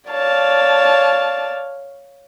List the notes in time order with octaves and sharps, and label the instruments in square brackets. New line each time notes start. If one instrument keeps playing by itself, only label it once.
[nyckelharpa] C#5 F5 [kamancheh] D5 A5